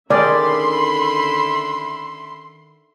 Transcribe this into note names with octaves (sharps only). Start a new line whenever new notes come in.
D3 D#3 C#4 G#4 D5 E5 B5 C6